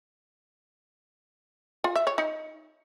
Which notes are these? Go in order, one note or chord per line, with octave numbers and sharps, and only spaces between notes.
F4
E5
C#5
D#4